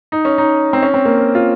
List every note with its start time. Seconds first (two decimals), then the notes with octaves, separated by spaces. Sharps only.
0.12 D#4
0.25 C#4
0.38 D#4
0.73 C4
0.83 C#4
0.94 C4
1.05 A#3
1.18 C#4
1.35 F4